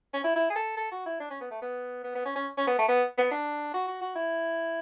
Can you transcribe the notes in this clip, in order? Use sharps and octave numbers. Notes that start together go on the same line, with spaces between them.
C#4
E4
E4
G#4
A4
A4
F#4
E4
D4
C#4
B3
A3
B3
B3
B3
C#4
C#4
C#4
B3
A3
B3
B3
D4
F#4
F#4
F#4
E4